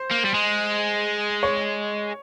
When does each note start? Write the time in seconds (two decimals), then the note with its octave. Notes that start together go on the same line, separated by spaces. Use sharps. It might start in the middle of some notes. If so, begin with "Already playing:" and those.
Already playing: C5
0.11 A#3
0.25 G3
0.34 G#3
1.43 C#5